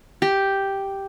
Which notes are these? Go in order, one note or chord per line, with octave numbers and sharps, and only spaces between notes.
G4